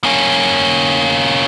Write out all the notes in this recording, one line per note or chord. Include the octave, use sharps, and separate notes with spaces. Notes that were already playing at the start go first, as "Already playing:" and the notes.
A#3 C#4